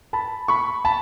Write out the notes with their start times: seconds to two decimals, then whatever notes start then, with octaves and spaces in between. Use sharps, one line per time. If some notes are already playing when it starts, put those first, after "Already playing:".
0.13 A5 B5
0.48 B5 C#6
0.85 A5 B5